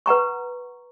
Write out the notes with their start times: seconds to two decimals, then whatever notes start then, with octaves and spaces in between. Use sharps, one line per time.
0.06 B4 F#5 A#5 C#6